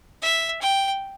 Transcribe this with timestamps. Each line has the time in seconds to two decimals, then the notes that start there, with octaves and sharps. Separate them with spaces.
0.22 E5
0.62 G5